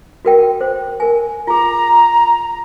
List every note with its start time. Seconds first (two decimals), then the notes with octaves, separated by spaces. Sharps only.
0.25 F#4 A#4 G5
0.61 C5
1.00 A#4 G#5
1.47 F4 G#4 A#5